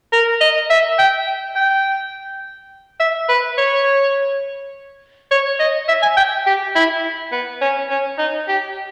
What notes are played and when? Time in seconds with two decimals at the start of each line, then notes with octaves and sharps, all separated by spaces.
0.12 A#4
0.41 D#5
0.70 E5
0.99 G5
1.56 G5
3.00 E5
3.29 B4
3.58 C#5
5.31 C#5
5.60 D#5
5.88 E5
6.02 G#5
6.17 G5
6.46 G4
6.75 E4
7.32 B3
7.61 C#4
7.90 C#4
8.18 D#4
8.48 G4